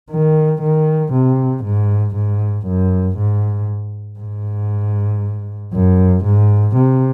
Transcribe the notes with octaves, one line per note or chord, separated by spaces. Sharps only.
D#3
D#3
C3
G#2
G#2
F#2
G#2
G#2
F#2
G#2
C3